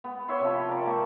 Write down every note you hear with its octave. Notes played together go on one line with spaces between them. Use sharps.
B3
B4 C#5 E5 C6
C3 F3
A#4 D5
A#3 C5 C#6